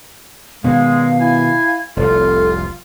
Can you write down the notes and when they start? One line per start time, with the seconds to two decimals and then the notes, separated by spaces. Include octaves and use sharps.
0.64 B2 D#3 G#3 B3 F5
1.20 E4 G#5
1.97 F1 C2 F4 A4